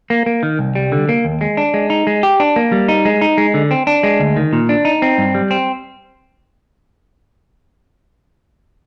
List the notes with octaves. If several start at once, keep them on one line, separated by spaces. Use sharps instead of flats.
A#3
A#3
D#3
C2
G3
D3
A#3
D#2
G#3
D4
G#3
D#4
G#3
G4
D4
A#3
G3
D#4
G#3
D#4
G#3
D3
C4
D4
G#3
D2
D#3
A#2
D4
D#4
C4
G2
G3
C4